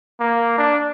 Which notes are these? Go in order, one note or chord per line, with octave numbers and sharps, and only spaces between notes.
A#3
D4